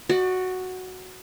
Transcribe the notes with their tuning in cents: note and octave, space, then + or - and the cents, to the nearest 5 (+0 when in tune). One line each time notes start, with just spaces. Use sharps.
F#4 +0 D5 +35